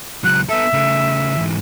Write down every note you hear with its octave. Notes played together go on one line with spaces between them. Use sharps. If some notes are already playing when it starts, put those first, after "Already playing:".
C#2 F#3 F#6
B3 A4 E5
C#3 A3
G#2 E3